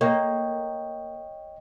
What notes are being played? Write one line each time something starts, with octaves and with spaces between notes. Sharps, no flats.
A#3 C#5 D#5 G5